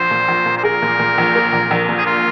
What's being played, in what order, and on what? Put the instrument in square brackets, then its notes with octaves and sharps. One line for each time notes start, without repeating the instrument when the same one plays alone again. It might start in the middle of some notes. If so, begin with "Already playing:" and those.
Already playing: [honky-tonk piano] A#1 [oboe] C5
[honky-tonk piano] A#2
A#1
A#2
[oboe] C5
[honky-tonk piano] G#4 [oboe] A#4
[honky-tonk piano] A#2
A#2
A#1
A#3
A#1
A#1
A#2
[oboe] G#4
F4